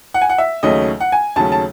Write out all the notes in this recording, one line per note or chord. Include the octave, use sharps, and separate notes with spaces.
F#5
G#5
F#5
E5
D#2 C#3 F#3 A3 C#4 D#5
F#5
G#5
D#2 C#3 F#3 A3 C#4 A5
A5